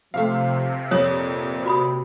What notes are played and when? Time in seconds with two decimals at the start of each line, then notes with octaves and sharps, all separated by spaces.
0.14 C3 F3 A3 F5
0.91 F2 A#2 C#5 D#6
1.66 F#4 B5 D#6